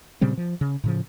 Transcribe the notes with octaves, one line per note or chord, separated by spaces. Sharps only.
A#2 C#3 G3 C4
F3
C#3
A2 C#3 F3